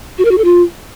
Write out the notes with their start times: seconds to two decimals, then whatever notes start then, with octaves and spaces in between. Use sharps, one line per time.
0.18 F#4
0.25 A#4
0.31 F#4
0.38 A4
0.44 F4